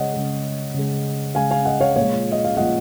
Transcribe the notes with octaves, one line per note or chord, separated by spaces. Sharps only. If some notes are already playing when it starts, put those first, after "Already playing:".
Already playing: C#3 G#3 C#5 D#5 F#5
C#3 G#3
C#3 G#3
C#3 G#3 F5 G#5
F5 G#5
D#5 F#5
C#5 F5
A#2 F3 G#3 C#5 F5
D#5
F5
A#2 F3 G#3 D#5 F#5